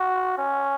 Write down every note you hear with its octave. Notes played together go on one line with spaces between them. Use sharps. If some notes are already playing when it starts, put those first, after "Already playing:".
Already playing: F#4
C#4